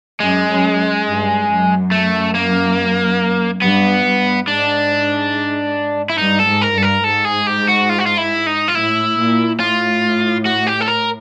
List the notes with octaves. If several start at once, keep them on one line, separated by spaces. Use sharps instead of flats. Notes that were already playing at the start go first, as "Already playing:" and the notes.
F#2 G#3
F#2
G2
F#2
A3
A#3
G2 B3
G2
G#2 D4
E4
G2 D#4
A4
G#2
A#4
G2 A4
A#4
G#2 A4
G#4
G4
F#4
F4
F#4
F4
E4
D#4
F4
A2 E4
A#2
A2 F4
F#4
G4
A4
A#4